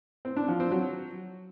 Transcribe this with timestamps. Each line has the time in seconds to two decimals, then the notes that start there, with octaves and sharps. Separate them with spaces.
0.25 C4
0.36 D4
0.48 F3
0.60 C4
0.71 F#3